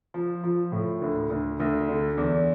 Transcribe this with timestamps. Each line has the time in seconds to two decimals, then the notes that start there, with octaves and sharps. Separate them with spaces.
0.14 F3
0.44 F3
0.72 A2
1.02 D2
1.30 D2
1.60 D2
1.89 D3
2.17 E2